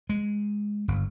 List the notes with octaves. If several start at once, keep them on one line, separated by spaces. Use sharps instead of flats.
G#3
G1